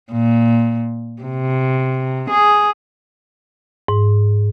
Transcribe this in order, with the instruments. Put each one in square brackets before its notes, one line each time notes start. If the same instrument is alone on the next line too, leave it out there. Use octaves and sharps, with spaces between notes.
[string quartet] A#2
C3
G#4
[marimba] G#2